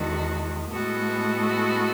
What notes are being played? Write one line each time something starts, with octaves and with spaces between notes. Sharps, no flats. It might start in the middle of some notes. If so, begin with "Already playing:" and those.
Already playing: E2 D#3 G#3 F#4 A4
A2 G#3 B3 F#4 A4